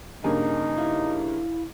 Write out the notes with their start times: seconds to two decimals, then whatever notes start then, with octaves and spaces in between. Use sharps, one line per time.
0.24 G2 C#3 A#3 D#4 G#5
0.77 E4 E5 F5